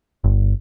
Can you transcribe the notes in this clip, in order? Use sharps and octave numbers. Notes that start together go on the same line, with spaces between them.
G1